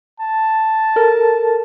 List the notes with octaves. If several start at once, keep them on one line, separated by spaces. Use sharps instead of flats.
A5
A4 A#4